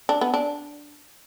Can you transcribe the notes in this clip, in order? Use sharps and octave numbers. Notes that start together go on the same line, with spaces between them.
D4
B3
D4